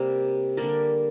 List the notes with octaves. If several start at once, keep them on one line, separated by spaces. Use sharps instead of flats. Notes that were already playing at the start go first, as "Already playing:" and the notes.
Already playing: C3 G3 A#3 A#4 D5
D3 G3 A#3 A#4 D5